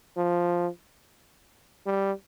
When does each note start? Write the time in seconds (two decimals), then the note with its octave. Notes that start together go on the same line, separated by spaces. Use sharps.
0.17 F3
1.86 G3